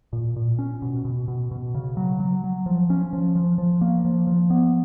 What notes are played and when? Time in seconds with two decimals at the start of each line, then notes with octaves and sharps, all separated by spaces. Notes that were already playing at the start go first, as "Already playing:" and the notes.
0.13 A#2
0.36 A#2
0.59 C#4
0.82 B2
1.05 B2
1.28 B2
1.51 B2
1.75 C#3
1.97 F#3
2.20 F#3
2.44 F#3
2.66 F3
2.90 C#4
3.13 F3
3.35 F3
3.58 F3
3.81 A#3
4.05 F3
4.27 F3
4.50 B3